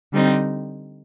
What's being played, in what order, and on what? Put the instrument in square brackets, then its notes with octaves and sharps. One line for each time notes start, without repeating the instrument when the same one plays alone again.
[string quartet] D3 G3 C4 D#4